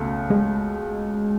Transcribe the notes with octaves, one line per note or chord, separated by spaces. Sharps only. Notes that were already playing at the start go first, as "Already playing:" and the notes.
Already playing: C#2 B2 A3
G#3